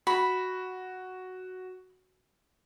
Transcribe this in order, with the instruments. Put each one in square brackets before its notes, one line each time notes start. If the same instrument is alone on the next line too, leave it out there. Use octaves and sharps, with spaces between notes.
[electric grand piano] F#4 [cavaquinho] B5